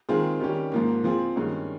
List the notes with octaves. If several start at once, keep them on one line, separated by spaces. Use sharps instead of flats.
D#3 G#3 C4 F4 G#4
D#3 G3 C#4 G4
G#2 F3 A#3
F3 C4 F4 G#4
G2 D#3 G#3 C#4 G#4